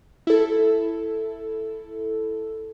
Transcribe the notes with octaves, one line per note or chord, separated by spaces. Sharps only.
E4 A4